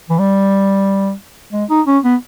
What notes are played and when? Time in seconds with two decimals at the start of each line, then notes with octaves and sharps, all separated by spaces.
0.10 E3
0.19 G3
1.53 G#3
1.70 D#4
1.86 C#4
2.04 B3